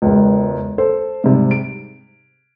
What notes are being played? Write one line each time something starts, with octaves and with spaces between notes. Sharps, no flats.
E1 C#2
A4 C5
G#2 C3 G3
D7